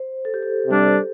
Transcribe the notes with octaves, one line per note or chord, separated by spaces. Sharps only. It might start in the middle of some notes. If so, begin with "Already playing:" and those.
Already playing: C5
A4
G4
A4
C3 G3 D4